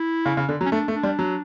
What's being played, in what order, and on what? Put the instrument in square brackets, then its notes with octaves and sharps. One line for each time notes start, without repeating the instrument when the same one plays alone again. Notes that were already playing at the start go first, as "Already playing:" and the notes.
Already playing: [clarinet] E4
[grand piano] C#3
C#3
D3
F#3
[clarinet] C#4
[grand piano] A3 [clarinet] D4
[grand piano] A3
[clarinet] D4
[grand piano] G3
F#3